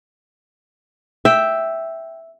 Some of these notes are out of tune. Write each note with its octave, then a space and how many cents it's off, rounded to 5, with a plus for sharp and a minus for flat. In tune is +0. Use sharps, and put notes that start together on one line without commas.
E5 +0 G5 +0